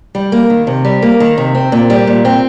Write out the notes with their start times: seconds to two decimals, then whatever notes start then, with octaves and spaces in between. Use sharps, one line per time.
0.15 G3
0.32 A#3
0.50 D#3
0.67 C3
0.85 G3
1.02 A#3
1.20 D#3
1.38 C3
1.55 C4
1.72 A#2
1.90 G3
2.07 A#2
2.25 C4